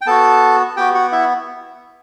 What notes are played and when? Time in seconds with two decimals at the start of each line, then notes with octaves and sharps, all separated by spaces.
0.01 G5
0.06 B3 F#4 A4 A5
0.77 B3 F#4 G4 G5
0.94 F#4 F#5
1.12 E4 E5